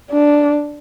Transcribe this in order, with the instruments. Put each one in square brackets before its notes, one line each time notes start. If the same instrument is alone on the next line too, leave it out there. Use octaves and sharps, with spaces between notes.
[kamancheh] D4